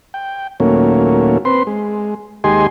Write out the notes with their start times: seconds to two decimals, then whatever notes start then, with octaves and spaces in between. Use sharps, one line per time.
0.14 G5
0.60 D#2 A#2 F#3 A3 A#3 C#4
1.45 C4 B4 C6
1.67 G#3
2.44 D#2 G#3 G4 D#5 G#5 C6